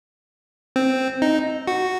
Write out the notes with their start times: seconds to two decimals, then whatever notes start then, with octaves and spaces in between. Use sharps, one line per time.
0.76 C4
1.22 D#4
1.67 F#4